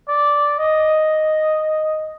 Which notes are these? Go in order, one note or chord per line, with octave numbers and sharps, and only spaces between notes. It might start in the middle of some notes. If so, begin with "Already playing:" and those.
D5
D#5